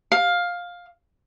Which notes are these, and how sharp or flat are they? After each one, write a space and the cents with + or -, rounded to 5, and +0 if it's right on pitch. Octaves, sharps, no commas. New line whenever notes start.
F5 +10